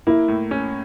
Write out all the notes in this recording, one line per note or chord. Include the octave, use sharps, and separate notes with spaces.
A#3 E4
A2
C#4